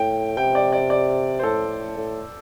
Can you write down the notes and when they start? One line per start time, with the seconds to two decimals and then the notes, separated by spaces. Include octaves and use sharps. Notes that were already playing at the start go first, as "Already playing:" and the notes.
Already playing: A2 G5
0.37 C3 G5
0.55 D5
0.72 D5
0.90 D5
1.39 C5
1.43 A2 A4
1.97 A2